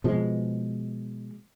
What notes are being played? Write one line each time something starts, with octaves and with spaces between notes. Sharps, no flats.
B2 F3 G#3